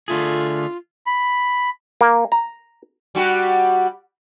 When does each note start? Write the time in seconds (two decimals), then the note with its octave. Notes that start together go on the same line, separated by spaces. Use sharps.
0.08 D3 A3 F4 G#4
1.06 B5
2.01 A#3
2.32 A#5
3.15 G3 F#4 G4